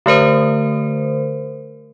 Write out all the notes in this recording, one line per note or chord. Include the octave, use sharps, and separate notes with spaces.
D3 A3 A#4 C5